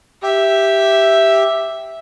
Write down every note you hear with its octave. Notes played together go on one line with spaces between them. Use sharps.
G4 E5